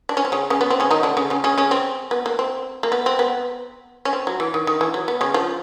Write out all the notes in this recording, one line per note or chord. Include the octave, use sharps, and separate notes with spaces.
D4
C#4
C4
C#3 C#4
C#3 C#4
B3
C4
C#3 C#4
D#3 D#4
D3 D4
C#3 C#4
C#3 C#4
C#3 C#4
C#3 C#4
C4
B3
A#3
C4
A#3
B3
C4
B3
C#4
C4
F#3
E3
D#3
D#3
E3
F#3
B3
C#3 C#4
F3 F4